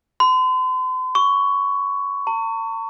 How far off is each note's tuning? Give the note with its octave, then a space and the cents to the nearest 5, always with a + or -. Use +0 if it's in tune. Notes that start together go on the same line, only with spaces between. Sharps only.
C6 -40
C#6 +15
A5 +45